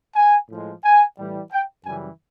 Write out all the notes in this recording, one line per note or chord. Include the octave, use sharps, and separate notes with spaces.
G#5
A2 F3 G#3
G#5
A2 E3 G3
G5
F#2 C#3 E3 G3 G#5